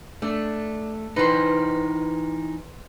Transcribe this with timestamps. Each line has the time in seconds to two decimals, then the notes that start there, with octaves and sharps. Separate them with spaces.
0.22 A3 D4
1.16 E3 D#4 B4 C5